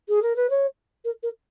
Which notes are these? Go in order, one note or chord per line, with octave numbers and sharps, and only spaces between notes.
G#4
A#4
B4
C#5
A#4
A#4